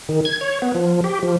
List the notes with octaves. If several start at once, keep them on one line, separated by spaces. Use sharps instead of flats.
D#3
G#6
C#5
B3
F3
G4
F3